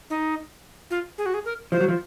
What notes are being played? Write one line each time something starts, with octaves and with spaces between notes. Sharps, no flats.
D#4
F4
G#4
F#4
G#4
A#4
F3 C5
F#3
F3